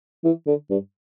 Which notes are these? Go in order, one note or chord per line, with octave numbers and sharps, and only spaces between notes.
E3
D3
G2